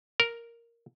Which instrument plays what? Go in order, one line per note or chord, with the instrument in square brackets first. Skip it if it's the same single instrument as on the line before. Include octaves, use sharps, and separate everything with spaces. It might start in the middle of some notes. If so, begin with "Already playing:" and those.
[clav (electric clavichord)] A#4